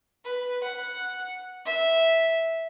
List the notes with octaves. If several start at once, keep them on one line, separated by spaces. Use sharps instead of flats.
B4
F#5
E5